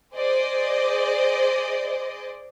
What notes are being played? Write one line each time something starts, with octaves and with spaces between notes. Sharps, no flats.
G#4 C5 D5 D#5